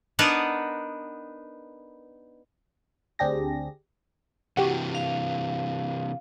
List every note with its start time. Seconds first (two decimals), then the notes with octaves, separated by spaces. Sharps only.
0.19 B3 D4 D#4 A#4 B4 F#5
3.19 D2 C4 D4 G4 G#4 A#6
4.57 C3 E3 F#4 G4
4.95 F5